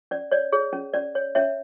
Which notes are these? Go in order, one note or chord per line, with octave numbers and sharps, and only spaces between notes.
C#4 D5
C#5 D5
G#4 C#5
C#4
C#4 D5
C#5
C#4 C#5 E5